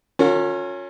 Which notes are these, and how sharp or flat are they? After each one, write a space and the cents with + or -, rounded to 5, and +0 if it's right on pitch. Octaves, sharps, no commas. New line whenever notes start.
C#4 +0 F4 +45 A#4 -40